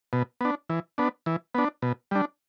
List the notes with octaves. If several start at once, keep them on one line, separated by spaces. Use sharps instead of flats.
B2
B3 D4
E3
B3 D4
E3
B3 D4
B2
G3 D4